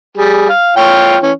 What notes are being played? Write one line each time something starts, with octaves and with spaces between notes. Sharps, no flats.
G3 G#4
F5
F4 C#5 G5
E3 C#4